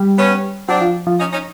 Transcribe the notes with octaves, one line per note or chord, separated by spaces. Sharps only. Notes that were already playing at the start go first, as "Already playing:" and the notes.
Already playing: G3
B3 C#4
F#3 C4 D4
F3
F3
C#4 D#4
C#4 D#4